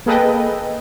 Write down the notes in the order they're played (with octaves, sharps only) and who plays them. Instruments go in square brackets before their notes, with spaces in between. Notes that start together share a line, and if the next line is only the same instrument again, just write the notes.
[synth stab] A#3 G#4 A4 B4 D#5 G5